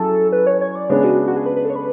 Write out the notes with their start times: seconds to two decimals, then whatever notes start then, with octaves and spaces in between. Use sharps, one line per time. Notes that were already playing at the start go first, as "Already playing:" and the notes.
Already playing: F#3 C#4 E4 G#4 A4
0.32 B4
0.47 C#5
0.61 C#5
0.75 D5
0.89 C#3 G#3 B3 D4 C#5
1.04 F#4
1.27 F#4
1.37 G#4
1.46 B4
1.56 B4
1.65 A4
1.70 C#5
1.76 B4